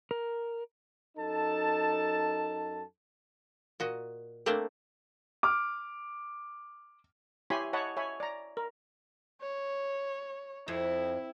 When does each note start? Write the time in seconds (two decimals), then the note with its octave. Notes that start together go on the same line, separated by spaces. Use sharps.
0.11 A#4
1.17 F#2 D#4 A4 A5
3.80 A#2 F#4 D#5
4.46 A3 A#3 C4 D4 C5 D5
5.43 D6 F6
7.50 E4 G4 C#5 G#5 B5 C6
7.73 C#5 D#5 F#5 A5 B5
7.97 C#5 E5 G#5 B5
8.20 D5 A#5
8.57 A#4
9.41 C#5
10.68 F2 E4